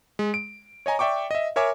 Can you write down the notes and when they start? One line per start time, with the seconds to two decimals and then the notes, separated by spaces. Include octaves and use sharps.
0.19 G#3
0.34 D7
0.86 C#5 D#5 G#5 A#5
0.99 D5 E5 G5 C#6 D6
1.31 D#5 E5
1.56 A#4 C#5 E5 G#5 D6